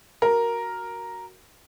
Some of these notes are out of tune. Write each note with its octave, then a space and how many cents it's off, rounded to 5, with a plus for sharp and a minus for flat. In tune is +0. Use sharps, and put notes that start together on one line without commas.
F#4 +0 A#4 +0